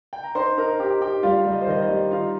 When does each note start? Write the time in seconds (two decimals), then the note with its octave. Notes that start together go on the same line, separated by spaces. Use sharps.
0.13 G5
0.24 A#5
0.35 D#4 C5 C6
0.58 D#4 A#4 A#5
0.79 D#4 G4 G5
1.01 D#4 G4 G5
1.23 G3 F4 F5
1.45 G3
1.52 D#5
1.61 C5
1.67 D#3 D#5
1.82 D#5
1.89 G3
2.11 D#4 F4 F5